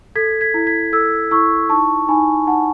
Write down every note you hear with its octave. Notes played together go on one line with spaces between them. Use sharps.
A4 G#6 B6
G#6 B6
E4
G#6 B6
A4 E6 G#6
E4 C#6 E6
D#4 A5 C#6
D#4 G#5 B5
D#4 F#5 A5